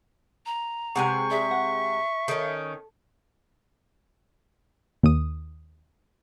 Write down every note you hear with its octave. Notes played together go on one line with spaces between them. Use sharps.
A#5
C3 G#3 G4 B4 F#5 G#5 C#6
G#4 D5 E5 A#5
C5 F#5
D#3 C#4 A4
D#2 D#6